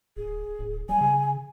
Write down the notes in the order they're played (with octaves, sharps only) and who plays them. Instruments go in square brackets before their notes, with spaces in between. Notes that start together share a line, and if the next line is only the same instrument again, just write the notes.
[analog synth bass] D1 [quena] G#4
[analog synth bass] D1
[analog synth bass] G3 [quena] G#5
[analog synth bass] C#3